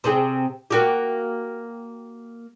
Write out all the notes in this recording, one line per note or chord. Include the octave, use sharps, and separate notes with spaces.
C3 C4 G#4
A#3 F#4 G4